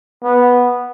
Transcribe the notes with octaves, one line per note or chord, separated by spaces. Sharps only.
B3